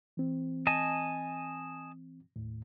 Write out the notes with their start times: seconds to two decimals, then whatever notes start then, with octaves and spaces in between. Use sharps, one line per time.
0.17 E3 C4
0.67 D#5 G#5 A5
2.36 D#2 A2